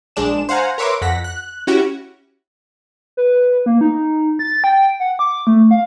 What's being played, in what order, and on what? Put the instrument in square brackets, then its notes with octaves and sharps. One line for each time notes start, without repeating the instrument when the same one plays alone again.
[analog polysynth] A#1 G#3 D4 E7
C5 F5 F#5 G#5 A#5
A#4 B4 C#5 E5 C6 D6
F2 F#5 A#6 B6
F#6
C#4 E4 F#4 G4
[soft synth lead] B4
A#3
D#4
A6
G5
F#5
D6
A3
F5